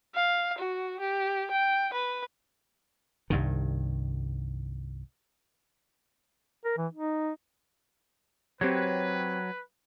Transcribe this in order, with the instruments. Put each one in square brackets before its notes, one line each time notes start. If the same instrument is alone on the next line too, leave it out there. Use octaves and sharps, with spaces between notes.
[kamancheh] F5
F#4
G4
G5
B4
[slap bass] C2 G2 D#3
[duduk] A#4
E3
D#4
[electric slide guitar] F#3 [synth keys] C4 G4 C#5 [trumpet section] B4